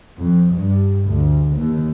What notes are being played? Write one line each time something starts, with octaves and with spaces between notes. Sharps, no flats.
F2
G2
D2
D#2